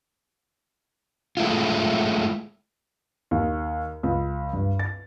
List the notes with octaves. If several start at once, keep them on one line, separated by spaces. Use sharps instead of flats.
G#3 A3 E4 F4
D#2
C#2
G2
A6